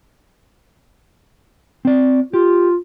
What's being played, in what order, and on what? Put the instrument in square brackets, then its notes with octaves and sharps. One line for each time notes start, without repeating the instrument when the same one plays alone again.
[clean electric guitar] C4 D5
[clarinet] F4 [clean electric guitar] G4